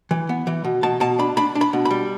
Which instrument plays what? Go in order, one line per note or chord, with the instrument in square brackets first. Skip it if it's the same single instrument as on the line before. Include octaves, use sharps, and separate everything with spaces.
[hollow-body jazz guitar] E3
B3
E3
B2
B2 A5
B2 A5
D4 B5
D4 B5
D4
B5
B2
B5
G3